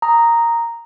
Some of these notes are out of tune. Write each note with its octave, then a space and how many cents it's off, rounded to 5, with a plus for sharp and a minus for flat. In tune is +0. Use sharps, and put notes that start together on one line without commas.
A#5 -5 D#6 +0